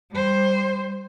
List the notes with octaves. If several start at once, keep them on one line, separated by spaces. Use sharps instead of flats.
G3 C5